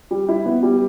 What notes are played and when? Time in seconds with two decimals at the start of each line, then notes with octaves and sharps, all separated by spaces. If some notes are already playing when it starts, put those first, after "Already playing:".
0.11 G3
0.29 E4
0.46 B3
0.63 G3